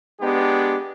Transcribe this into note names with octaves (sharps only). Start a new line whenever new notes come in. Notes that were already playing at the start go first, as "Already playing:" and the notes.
G#3 B3 D4 G4